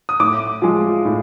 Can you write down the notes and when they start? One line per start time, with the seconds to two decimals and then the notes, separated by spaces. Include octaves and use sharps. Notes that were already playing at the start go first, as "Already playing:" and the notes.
0.09 D#6
0.20 A2 D6
0.62 F3 G#3
1.05 A2